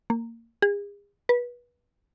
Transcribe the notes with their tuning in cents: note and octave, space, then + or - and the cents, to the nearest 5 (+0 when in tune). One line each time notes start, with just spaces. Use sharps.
A#3 -20
G#4 -40
B4 -25